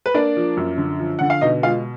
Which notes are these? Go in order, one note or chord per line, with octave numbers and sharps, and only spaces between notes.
B4
A#3 D4 D5
F3
F#2
D3
F3
D3 F#5
F5
B2 D#4 D#5
G#3 F4 F5